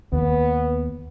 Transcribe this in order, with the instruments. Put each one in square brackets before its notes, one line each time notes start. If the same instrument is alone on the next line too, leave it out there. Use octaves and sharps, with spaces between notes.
[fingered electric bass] D#2 [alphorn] B3